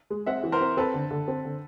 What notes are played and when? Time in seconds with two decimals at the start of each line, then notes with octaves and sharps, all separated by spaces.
0.10 G#3
0.26 C4 E5 F#5
0.43 E3
0.52 A#4 C5
0.61 C4
0.77 C4 A4 B4
0.94 D3
1.11 D3
1.28 C4
1.45 D3